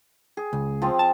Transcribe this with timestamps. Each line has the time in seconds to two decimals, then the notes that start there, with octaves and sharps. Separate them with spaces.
0.37 G#4
0.53 C#2
0.82 F3 C4
0.99 A5